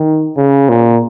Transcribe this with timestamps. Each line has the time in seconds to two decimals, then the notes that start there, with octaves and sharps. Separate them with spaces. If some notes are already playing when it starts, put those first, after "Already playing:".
Already playing: D#3
0.37 C#3
0.69 A#2